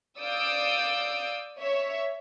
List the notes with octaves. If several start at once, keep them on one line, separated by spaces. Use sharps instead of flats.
D5 F5 D#6 E6 G6 D7
C#5 E5